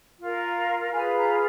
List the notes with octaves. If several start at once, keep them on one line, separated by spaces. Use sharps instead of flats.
F4 A#4
F4 G#4 B4 G#5
A#5